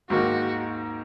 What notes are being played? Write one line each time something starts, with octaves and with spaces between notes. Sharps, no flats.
G#2 D#3 A#3 D#4 F#4 A#4